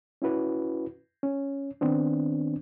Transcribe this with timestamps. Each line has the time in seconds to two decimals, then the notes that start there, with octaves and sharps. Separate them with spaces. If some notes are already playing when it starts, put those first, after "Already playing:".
0.22 C#4 E4 F#4 B4
1.23 C#4
1.81 D#3 B3 C4 D4